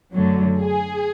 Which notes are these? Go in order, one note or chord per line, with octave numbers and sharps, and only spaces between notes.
F#2 D3 F#3 A3
G#4